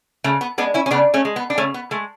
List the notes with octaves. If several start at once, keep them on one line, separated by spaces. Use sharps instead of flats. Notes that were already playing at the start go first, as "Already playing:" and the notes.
C#3 A3
B3
G#3 B3 D4
C#4 E4
C#4
C#3 B3 D4
A3 C#4
G#3
B3
D4
C#3 A3 C#4
B3
G#3 A3